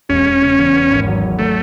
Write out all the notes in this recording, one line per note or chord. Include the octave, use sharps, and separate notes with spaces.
E1 C#4
E1
C#3
E2
B3
G#1
F#3
G#2
F#3 A3